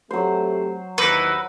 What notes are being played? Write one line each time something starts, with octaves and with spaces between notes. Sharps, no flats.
F#3 A3 C4 G4 C5
D#2 E3 D#4 E4 B4